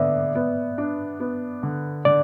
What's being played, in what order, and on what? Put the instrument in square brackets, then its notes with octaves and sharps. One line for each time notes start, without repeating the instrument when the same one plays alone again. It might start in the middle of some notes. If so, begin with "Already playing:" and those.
Already playing: [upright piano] D3 B3 [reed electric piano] D5 E5
[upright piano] B3
D4
B3
D3
[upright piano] D3 [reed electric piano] D5